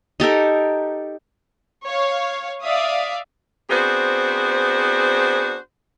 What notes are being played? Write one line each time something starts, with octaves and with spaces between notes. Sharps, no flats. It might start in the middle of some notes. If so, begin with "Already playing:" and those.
D#4 G4 A4 A#4
C#5 F5
D5 E5 F5 D#6
B3 C4 D4 F#4 G#4 C5